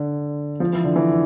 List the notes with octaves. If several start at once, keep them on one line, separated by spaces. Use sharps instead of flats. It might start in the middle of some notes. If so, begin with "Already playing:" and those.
Already playing: D3
F3
E3
D3
E3